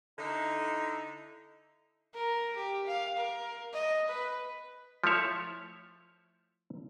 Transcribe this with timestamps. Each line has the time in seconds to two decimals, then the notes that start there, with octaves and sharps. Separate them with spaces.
0.18 D3 D#4 E4
2.15 A#4
2.56 G4
2.87 F5
3.17 A#4
3.74 D#5
4.09 B4
5.04 F3 A3 E4 C#5 E5